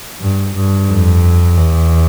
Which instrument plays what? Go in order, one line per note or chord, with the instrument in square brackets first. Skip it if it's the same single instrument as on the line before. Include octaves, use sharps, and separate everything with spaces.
[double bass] G2
G2
F2
E2